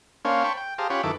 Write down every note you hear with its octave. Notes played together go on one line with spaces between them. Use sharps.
A#3 C#4 D4 C5 C#5 F5
C5 C#5 G5 A5 B5 C#6
G5
G4 G#4 C5 F5 A5 A#5
C#4 F4 G4 C#5 F#5 B5
F#2 D#3 E4 A4 B4 D6